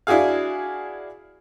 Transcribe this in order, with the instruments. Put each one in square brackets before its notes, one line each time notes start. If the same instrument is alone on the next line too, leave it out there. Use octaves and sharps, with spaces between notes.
[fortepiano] D4 E4 F#4 G#4 F5